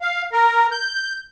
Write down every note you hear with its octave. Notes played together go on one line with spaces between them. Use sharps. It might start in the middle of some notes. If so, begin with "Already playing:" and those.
F5
A#4
G6